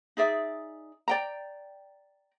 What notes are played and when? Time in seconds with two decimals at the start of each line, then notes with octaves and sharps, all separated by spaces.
0.17 D#4 G#4 D5 E5
1.08 D5 G5 A#5